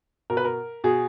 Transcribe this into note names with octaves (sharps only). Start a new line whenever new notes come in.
B2 A#4
B4
A#4
B2 G#4